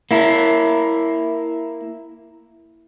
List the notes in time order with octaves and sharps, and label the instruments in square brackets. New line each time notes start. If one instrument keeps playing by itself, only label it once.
[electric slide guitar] A#3 E4